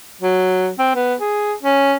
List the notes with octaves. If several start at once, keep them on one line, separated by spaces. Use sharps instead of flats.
F#3
C4
B3
G#4
C#4